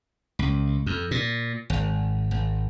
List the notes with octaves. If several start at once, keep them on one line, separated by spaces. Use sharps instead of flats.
C#2
F2
A#2
G#1
G#1